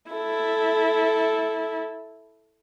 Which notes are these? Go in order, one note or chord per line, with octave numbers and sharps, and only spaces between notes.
E4 A4